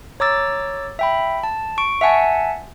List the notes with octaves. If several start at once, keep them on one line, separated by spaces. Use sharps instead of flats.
C#5 A#5 D6 E6 A6
E5 G5 B5
A5
C#6 D7
E5 F#5 G#5 A5